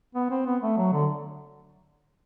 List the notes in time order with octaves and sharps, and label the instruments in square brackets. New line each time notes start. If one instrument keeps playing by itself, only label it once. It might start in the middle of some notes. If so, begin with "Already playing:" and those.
[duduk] B3
C4
B3
A3
F#3
D3